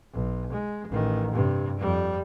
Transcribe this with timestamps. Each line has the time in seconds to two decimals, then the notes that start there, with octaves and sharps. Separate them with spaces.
0.13 B1
0.52 G#3
0.88 A1 D#3
1.31 G2 C3
1.79 F2 G3